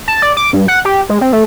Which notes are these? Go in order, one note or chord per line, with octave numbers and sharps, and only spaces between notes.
A5
D5
D6
G2
F#5
G4
G#3
C4
A3